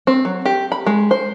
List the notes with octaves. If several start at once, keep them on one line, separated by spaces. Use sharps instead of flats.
C4
F#3
G4
B5
G#3
C5